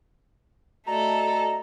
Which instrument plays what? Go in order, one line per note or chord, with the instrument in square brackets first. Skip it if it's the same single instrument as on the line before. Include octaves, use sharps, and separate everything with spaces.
[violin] A3 A4 [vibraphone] F#4 D5 D#5 [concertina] A#5